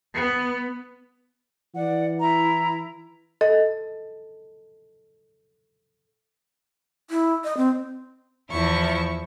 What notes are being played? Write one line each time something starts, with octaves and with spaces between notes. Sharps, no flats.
B3
E3 D5 F#5
E4 A#5
A4 D#5
E4
D#5
C4
E2 F3 E4 C#6